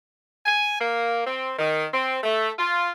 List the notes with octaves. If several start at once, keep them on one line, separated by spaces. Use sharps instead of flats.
G#5
A#3
C4
D#3
C4
A3
F4